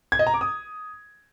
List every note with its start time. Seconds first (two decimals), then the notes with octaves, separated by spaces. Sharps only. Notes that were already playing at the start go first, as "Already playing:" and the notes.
0.12 G#6
0.19 D#5
0.27 A#5
0.34 D6
0.41 D#6